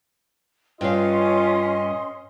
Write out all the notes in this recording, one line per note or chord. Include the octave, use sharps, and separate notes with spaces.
G2 C#4 F4 D#5 F5 C6